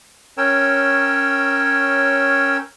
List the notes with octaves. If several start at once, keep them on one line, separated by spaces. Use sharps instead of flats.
C#4 A#4 C#5 G5 E6